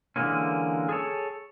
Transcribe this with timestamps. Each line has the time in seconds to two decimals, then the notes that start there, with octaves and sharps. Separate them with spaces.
0.16 D3 E3 G3 G#3 A#3 C#4
0.89 G#4 A4 C#5